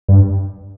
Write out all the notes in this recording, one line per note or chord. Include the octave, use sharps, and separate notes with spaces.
G2